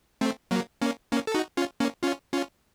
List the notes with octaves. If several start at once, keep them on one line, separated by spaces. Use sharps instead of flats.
A3 C4
F#3 A#3
A#3 C#4
A#3 C#4
A4
D#4 F#4
C#4 F4
A#3 C#4
C#4 F4
C#4 F4